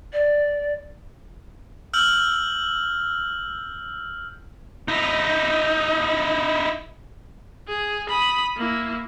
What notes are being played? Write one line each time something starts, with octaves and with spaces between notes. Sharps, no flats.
D5
E6 F6 G6 F#7
D#4 E4
G#4
B5 D#6
A#3 E4